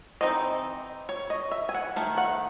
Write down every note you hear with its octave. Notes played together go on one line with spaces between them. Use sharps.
E3 C4 D#4 D#5
C#5
D#5
E5
G#5
F#5
D#3 A3
F#5